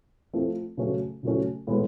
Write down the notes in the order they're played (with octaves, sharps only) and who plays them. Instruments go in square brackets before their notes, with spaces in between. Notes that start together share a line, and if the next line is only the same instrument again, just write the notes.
[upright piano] F3 A3 C4 F4
C#3 F#3 A3 C#4
C#3 F#3 A3 C#4
A2 E3 G#3 B3